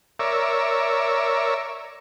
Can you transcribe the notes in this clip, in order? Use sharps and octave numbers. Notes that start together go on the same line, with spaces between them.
A#4 C#5 D5 E5